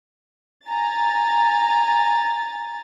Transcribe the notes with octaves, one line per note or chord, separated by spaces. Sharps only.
G#5 A#5 A6